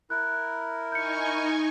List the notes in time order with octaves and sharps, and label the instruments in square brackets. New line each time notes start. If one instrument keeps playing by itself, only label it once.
[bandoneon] E4 A#4 [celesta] F#6
[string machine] D#4 G#5 C#6 [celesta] G6 C#7